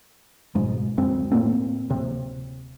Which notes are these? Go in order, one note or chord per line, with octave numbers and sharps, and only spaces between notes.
F#1 G#2 B2 G#3
D1 F#2 G#3 C4
A2 A#3 C4
D1 C3